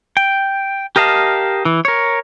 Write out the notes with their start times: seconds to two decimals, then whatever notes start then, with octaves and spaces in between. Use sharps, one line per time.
0.17 G5
0.96 G4 A#4 D#5 F5 A5
1.65 E3
1.85 A#4 C#5